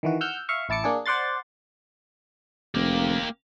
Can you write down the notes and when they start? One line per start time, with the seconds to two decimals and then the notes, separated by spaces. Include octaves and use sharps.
0.03 D#3 E3 F#4
0.21 F#5 E6 F6 G6
0.49 E5 F5 C#6
0.69 A1 E4 A5 D6 C#7
0.84 A#3 D4 G#4
1.06 C5 D5 F#5 C6 A6
2.75 F1 A#3 G4